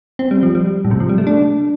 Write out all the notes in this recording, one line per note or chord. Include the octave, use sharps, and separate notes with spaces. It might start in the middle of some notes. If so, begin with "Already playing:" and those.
C4
G3
F3
G3
A2
C3
F3
G3
A3
D4